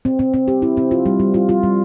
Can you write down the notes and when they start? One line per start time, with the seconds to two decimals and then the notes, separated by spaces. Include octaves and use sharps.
0.05 C4
0.19 C4
0.34 C4
0.48 G4
0.62 E4
0.77 C4
0.91 F4
1.06 G3
1.20 G3
1.34 F4
1.49 F4
1.63 G3